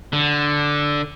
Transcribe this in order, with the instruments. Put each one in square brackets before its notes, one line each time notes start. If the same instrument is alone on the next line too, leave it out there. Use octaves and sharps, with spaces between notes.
[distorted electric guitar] D3